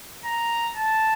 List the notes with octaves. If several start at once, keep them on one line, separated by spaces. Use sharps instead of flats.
A#5
A5